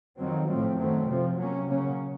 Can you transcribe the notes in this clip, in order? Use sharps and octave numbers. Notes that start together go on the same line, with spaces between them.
F2 D#3 F#3 C4
A2 F3 A3 C4
F#2 D#3 F#3 A3 C4
C3 F3 C4
C3 F#3 A#3 C#4
C#3 F#3 A#3 C#4